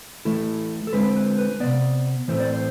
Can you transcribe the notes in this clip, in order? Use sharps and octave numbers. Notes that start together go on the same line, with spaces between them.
E3 A3 E4 A4
A4
D3 G#3 C4 F4 B4
B4
B4
C3 E3 B3 D5
A2 E3 A3 C4 C5
D5
C5